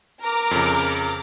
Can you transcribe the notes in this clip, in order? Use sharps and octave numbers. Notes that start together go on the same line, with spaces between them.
A#4 A#5 D6
F2 C#3